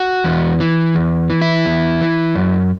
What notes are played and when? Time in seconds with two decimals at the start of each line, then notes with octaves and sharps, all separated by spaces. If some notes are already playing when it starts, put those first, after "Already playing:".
Already playing: F#4
0.24 E2
0.60 E3
0.95 E2
1.30 E3
1.42 E4
1.66 E2
2.01 E3
2.35 F#2